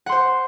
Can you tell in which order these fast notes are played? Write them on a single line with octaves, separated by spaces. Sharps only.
F#5 C6 C5